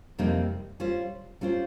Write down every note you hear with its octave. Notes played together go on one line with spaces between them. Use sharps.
F2 C3 G3 A#3 D#4
G3 C#4 F4 C5
G3 C#4 F4 C5